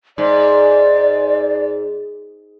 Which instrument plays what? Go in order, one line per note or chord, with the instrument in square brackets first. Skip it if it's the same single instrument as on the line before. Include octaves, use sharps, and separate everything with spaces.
[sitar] G#2 [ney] D5